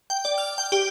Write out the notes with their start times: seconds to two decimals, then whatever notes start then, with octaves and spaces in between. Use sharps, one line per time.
0.10 G5
0.25 D5
0.38 F6
0.58 G5
0.72 G4